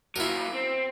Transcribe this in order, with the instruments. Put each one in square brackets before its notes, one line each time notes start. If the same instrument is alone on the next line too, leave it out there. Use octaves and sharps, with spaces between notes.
[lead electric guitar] F#3 A#3 [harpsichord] E4 A#4
[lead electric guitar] C4